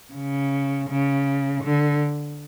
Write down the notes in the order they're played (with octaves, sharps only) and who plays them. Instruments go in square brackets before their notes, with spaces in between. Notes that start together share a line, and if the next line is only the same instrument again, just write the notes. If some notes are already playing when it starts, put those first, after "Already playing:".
[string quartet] C#3
C#3
D3